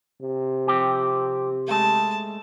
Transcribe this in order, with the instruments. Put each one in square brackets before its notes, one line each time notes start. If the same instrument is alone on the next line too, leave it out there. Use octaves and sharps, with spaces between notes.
[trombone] C3
[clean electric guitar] F3 C4 G4
[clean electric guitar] G#3 A3 [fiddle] A5